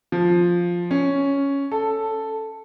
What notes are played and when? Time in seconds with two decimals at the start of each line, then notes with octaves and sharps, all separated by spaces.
0.12 F3
0.91 C#4
1.72 A4